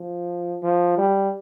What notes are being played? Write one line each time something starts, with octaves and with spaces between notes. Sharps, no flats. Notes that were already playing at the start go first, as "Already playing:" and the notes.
Already playing: F3
F3
G3